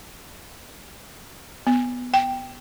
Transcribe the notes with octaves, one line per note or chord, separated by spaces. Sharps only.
B3
G5